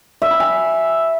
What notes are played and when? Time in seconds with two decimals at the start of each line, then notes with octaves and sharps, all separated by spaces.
0.22 E5
0.31 B5
0.40 G#5